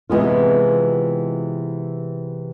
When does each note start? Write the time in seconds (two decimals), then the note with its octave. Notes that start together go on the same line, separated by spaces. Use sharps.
0.10 C3 E3 G#3 B3 F4